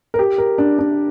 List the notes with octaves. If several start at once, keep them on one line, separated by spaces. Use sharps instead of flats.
A#4
G4
A#4
D4
D4